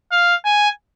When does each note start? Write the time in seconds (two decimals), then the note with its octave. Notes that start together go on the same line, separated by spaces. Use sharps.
0.12 F5
0.45 G#5